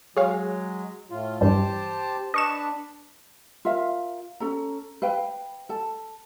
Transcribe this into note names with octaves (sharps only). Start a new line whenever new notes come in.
F#3 G#3 G#4 C#5 F5
A2 F4
G2 E3 G3 G4 C5 A5
D4 B4 D#5 C#6 E7
F4 A#4 E5 F5
C#4 A4 A#5
B4 F5 G5
A4 A5